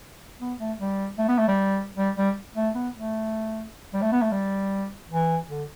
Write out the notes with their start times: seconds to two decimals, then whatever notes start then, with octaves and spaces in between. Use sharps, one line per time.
0.40 B3
0.59 A3
0.80 G3
1.18 A3
1.28 B3
1.38 A3
1.48 G3
1.97 G3
2.16 G3
2.56 A3
2.75 B3
2.95 A3
3.93 G3
4.02 A3
4.12 B3
4.22 A3
4.32 G3
5.10 E3
5.49 D3